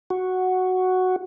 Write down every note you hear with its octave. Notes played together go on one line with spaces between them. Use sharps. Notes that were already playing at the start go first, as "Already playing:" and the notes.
F#4